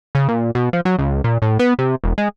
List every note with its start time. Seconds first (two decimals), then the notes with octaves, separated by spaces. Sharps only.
0.15 C#3
0.28 A#2
0.55 B2
0.73 F3
0.85 F#3
0.98 C#2
1.24 A#2
1.42 A2
1.59 B3
1.79 C3
2.04 E1
2.18 G#3